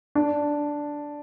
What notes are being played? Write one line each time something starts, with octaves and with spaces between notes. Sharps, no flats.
D4